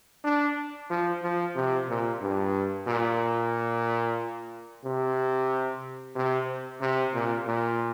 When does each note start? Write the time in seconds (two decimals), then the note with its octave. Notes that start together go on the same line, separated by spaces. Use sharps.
0.24 D4
0.90 F3
1.23 F3
1.56 C3
1.89 A#2
2.21 G2
2.87 A#2
4.84 C3
6.16 C3
6.81 C3
7.14 A#2
7.47 A#2